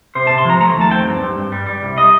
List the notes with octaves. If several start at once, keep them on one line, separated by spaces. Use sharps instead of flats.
C3 C5
C3 A5
C6
F3 A#5
A3 A#5
D#2 A5
C4 G5
G2
G2
G2
G3
G3
C2
D#5